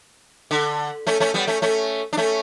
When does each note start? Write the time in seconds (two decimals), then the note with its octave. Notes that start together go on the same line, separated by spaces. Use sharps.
0.51 D3
1.07 A3 C#4
1.20 A3 C#4
1.34 G3 B3
1.47 A3 C#4
1.62 A3 C#4
2.13 D4
2.17 A3 C#4